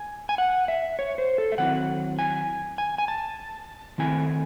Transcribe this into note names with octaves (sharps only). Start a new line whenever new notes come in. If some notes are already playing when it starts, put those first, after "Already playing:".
Already playing: G#5
G#5
F#5
E5
C#5
C5
A4
E5
D#3 F#3 C4 E4 F#5
G#5
G#5
G#5
A5
D#3 A3 C4 E4 G#5